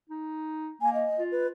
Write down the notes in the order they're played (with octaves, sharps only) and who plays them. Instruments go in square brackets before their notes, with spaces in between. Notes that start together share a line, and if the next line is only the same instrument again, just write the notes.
[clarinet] D#4
[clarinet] A#3 [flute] G#5
[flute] D#5
[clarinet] F4
[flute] B4